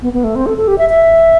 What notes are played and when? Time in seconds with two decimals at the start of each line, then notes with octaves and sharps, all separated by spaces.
0.02 B3
0.13 B3
0.24 A3
0.35 C4
0.46 A4
0.57 A4
0.68 G4
0.78 E5
0.89 E5